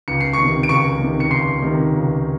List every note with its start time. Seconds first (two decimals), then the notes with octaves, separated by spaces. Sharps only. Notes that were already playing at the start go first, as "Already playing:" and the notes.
0.08 C#2 C#7
0.20 C7
0.33 D#3 C#6 C#7
0.43 C3
0.63 D7
0.69 C#2 C#6 C#7
1.00 C3 D#3
1.20 C#7
1.31 C#2 C6 C7
1.62 C3 D#3
1.93 C#2